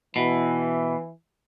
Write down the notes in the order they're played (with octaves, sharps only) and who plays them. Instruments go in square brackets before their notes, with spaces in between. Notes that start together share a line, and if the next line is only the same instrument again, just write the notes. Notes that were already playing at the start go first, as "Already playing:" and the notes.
[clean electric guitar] B2 [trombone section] E3